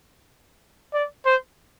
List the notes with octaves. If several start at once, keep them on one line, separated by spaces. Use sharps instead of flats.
D5
C5